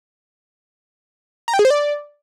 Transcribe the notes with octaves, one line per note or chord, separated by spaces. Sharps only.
A#5
G5
G#4
C5
D5